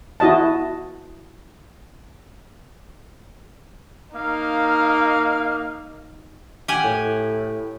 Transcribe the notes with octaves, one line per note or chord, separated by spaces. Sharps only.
E4 F#4 D#5 A5
A#3 D#4 F5
G4 F#5 G#5
A2